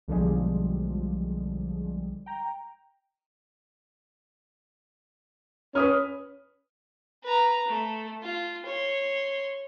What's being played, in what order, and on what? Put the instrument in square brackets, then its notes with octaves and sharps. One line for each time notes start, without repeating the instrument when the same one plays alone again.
[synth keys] B1 D3 F3 G3 G#3
G5 A#5
[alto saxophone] C#4 [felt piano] B4 D#6 F6
[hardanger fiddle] B4 A#5
A3
F4
C#5 C6